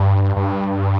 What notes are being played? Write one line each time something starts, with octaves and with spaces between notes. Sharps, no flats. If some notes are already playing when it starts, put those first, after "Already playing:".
Already playing: G2
G2